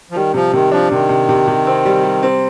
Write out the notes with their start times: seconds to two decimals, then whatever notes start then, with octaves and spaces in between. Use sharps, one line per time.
0.11 F3
0.15 D#3 G3
0.34 C3 F3
0.53 C3 D#3
0.72 F3 D4
0.91 C3 D#3
1.09 C3
1.29 C3
1.48 C3
1.67 C4
1.85 G3
2.03 G3
2.23 C4